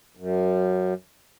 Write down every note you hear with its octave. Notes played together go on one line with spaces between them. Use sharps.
F#2